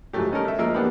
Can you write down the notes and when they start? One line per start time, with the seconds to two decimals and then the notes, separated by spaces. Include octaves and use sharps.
0.13 G#2 F3 F#3 A3 G4
0.32 G3 C#4 D#4 A4 A#4
0.45 A3 E5
0.59 F3 G#3 A#3 G#4 A#4 E6
0.74 E3 A#3 B3 D4 G4 B5